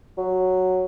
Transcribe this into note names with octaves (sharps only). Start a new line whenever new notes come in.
F#3